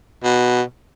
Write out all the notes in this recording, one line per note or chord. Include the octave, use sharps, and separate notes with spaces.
B2